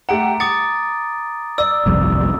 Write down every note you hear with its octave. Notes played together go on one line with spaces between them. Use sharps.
A3 G4 F#5 A#5 D7
D6 D#6 A6 C#7
D5 E6
G1 C2 F2